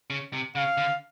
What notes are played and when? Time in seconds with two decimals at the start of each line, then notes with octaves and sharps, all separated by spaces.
0.10 C#3
0.33 C3
0.55 C#3 F5
0.78 D3